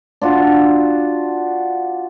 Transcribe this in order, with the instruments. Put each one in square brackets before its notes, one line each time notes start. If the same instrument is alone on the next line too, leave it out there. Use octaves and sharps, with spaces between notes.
[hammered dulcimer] D4 F4 F#4